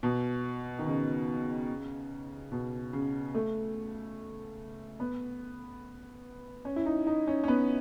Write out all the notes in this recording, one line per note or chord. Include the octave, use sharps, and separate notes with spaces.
B2
D#3
C#3
B2
C#3
A3
B3
C#4
E4
D#4
D#4
C#4
C#4
B3